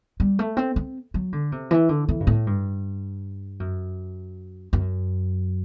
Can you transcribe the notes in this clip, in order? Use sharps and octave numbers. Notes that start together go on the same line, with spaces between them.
G3
A3
C4
C4
F#3
D3
C3
E3
D3
E3
G2
A2
G2
F#2
F#2